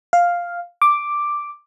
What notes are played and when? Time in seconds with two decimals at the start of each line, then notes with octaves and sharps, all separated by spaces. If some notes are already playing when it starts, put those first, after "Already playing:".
0.13 F5
0.82 D6